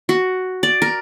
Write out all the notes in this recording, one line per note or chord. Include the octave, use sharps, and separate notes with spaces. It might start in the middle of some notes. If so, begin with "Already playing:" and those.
F#4
D5
A#4